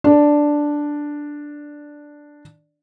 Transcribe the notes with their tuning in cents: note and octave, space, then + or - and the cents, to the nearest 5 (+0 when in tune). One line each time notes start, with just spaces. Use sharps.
D4 +0 D5 +0